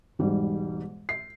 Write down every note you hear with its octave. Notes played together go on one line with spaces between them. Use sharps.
E1 G#2 G3
C7